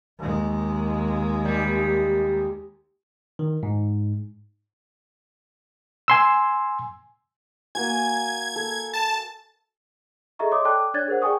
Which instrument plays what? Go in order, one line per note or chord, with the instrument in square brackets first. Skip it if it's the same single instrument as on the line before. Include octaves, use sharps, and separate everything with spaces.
[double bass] D#2 G#3
[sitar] G3
[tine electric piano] D#3
G#2
[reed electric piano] G#5 C6 E6
[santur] A#3 F#4 G#5 [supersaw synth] G#6
[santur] A4
[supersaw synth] A5
[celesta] G#4 A4 D#5 E5 A#5 C#6
C#5 D#5 C6 D6 D#6
A4 D5 G5 A5 D6 F#6
D4 C#5 D5 F#6 G#6 A6
G#4 A#4 C5 F#5
G#4 D5 G5 G#5 C#6 D#6